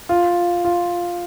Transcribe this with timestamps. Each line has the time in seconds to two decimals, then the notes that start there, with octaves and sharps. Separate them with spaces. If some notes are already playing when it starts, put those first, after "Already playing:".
0.09 F4
0.65 F4